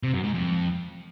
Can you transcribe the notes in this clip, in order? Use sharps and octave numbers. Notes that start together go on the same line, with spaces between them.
C3
F#2
G#2
F2